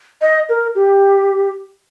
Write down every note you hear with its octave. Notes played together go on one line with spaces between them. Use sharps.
D#5
A#4
G4